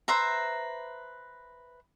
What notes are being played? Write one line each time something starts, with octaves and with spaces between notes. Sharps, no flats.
B4 C5 E5 A#5